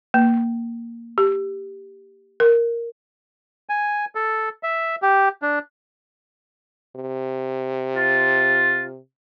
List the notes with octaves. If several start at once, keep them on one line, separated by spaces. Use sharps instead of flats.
A#3
G4
A#4
G#5
A4
E5
G4
D4
C3
F4